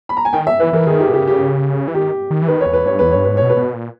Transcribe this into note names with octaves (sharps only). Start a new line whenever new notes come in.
B5
A#5
G#5
D#3 G5
E5
E3 B4
E3 A#4
D#3 G#4
G4
B2
C#3 G4
G4
E3
D#3 G4
D#3
E3
D#3 B4
C#5
E2
B4
G2 C#5
E2 B4
G2 C#5
G#2 B4
C#5
B2
B4
B2
A#2